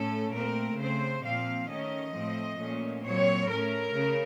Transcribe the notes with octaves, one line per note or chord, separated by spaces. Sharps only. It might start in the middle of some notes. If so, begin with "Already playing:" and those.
Already playing: A2 A3 C#4 A4
A#2 A3 C4 A#4
C#3 A3 C4 C5
A#2 F3 C4 F5
D#3 A3 C#4 D#5
A2 F3 A3 C4
A#2 A3 C#4
A#2 F#3 C4 C#5
A2 A3 C#4 A#4
C#3